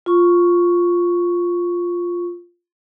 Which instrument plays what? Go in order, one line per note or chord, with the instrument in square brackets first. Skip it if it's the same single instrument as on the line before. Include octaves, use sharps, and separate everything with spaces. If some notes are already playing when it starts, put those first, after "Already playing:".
[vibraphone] F4 C#6